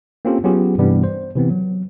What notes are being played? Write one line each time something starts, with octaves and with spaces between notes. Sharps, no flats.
A#3 C4 C#4 F4 G4 A4
F#3 B3 C#4 F4 G4 G#4
G2 C3 E3 G3 B3 D4
C5
C3 E3 B3 C4
F#3